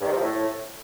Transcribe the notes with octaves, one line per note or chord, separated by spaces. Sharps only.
G2
D#3
C3
F3
A2